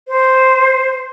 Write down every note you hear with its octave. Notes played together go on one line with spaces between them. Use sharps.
C5